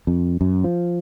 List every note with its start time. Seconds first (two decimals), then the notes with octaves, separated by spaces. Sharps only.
0.07 F2
0.41 F#2
0.64 F3